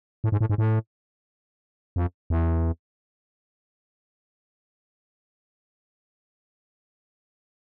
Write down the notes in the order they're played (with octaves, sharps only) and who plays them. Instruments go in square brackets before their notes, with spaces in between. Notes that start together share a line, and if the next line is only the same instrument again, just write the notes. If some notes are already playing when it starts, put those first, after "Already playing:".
[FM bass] A2
G#2
A2
G#2
A2
F2
E2